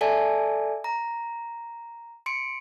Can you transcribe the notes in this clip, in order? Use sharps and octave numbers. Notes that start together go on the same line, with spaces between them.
A4 D5 E5 G#5 A5
A#5
C6 C#7 D7